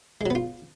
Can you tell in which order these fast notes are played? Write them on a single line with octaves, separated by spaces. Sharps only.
G#3 F#3 B3 F4